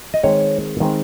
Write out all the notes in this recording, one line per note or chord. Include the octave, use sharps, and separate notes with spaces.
D#5
D#3 G#3 C4 C#5
D#3 G#3 C4